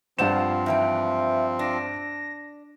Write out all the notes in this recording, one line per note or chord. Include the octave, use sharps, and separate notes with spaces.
G2 F3 C4 F4 C5 F#5 E7
G#2 E3 E5 G5
D4 A#6